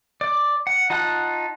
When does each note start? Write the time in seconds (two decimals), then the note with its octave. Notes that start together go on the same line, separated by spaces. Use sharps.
0.21 D5
0.67 F#5
0.90 D#4 F4 F#5 A5 F#6